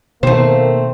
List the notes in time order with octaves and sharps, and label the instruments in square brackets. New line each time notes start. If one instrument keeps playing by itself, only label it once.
[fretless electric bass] B2 D#3 [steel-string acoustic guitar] A3 C4 [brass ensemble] A#3 [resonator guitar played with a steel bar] C5